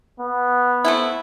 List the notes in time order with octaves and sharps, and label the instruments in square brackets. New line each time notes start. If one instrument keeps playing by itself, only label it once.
[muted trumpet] B3
[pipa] A3 C4 E4